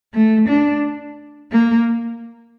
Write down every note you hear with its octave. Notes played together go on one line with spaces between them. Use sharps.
A3
D4
A#3